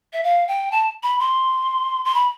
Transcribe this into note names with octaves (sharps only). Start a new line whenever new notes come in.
E5
F5
G5
A5
B5
C6
C6
B5